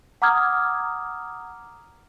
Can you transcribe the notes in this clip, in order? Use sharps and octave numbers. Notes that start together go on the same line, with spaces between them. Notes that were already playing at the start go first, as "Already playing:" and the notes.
F#5 A#5 D6 D#6 F6 G#6